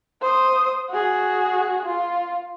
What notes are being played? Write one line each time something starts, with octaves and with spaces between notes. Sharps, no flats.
C5 D#6
F#4 G#4
F4